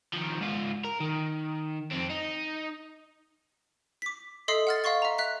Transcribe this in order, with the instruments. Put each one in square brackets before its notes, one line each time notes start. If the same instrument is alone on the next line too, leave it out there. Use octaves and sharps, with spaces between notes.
[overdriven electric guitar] D#3 F3
G#2 F4
A#4
D#3
F2 C4
D#4
[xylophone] D6 B6
A4 D#5 E5 C6 D#6 C7
F#5 F6 A6
D#5 F5 C6 C#6 A6
E5 A#5
E5 F#6 B6